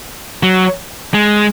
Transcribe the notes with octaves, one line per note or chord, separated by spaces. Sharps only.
F#3
G#3